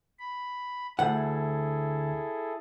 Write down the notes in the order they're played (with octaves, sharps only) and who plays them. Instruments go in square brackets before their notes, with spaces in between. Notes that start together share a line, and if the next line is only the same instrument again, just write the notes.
[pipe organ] B5
[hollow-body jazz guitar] D2 F#5 [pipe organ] E4 G#4 A4